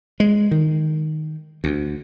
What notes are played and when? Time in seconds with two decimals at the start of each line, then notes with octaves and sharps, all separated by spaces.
0.20 G#3
0.51 D#3
1.64 D2